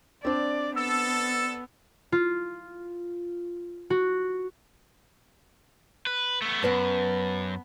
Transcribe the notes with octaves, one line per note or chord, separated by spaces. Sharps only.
C4 D4 D5
B3 A4 E6
F4
F#4
B4
A3 B3
F#2 B3 B4 A5